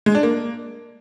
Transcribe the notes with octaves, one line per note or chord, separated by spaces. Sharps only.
G#3
D4
A#3